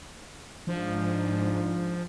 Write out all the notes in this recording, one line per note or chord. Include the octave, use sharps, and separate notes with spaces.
G#2 F3 D4